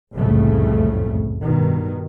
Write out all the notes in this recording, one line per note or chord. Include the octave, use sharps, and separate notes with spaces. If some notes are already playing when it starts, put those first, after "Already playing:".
F#1 C2 F2 A2 C#3 A3
G2 B2 D#3